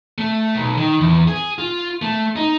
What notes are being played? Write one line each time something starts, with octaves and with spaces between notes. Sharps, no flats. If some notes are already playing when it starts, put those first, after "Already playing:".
A3
B1
D#3
E2
G#4
F4
A3
D#4